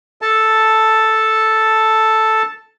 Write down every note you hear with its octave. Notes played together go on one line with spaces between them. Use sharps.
A4 A5